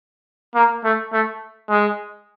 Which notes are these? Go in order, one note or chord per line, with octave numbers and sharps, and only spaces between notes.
A#3
A3
A3
G#3